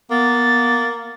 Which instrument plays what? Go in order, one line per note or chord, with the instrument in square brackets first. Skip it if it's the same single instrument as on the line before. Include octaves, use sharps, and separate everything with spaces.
[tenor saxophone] A#3 [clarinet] B3 [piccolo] A6